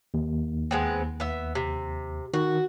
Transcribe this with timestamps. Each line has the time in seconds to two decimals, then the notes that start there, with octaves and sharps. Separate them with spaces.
0.14 D#2
0.71 G#3 B3 C4
1.20 B3 E5
1.55 C3
2.34 D#3 F#4